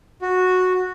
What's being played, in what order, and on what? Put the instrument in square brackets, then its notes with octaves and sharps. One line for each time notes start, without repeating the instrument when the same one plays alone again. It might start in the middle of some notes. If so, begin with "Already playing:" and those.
[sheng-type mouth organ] F#4